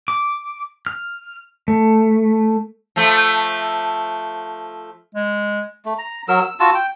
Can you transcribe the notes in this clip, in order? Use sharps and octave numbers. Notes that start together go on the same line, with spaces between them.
D6
F6
A3
F3 A3
G#3
A3
A#5
F#3 A#4 E6
E6
F4 F#4 A5 E6
G5